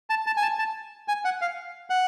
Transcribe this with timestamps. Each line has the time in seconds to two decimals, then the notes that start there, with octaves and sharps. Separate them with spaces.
0.10 A5
0.26 A5
0.37 G#5
0.42 A5
0.59 A5
1.08 G#5
1.25 F#5
1.42 F5
1.90 F#5